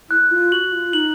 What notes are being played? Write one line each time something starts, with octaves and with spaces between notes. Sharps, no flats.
E4 F#6
F4
F#4 F#7
F4
D#4 F#7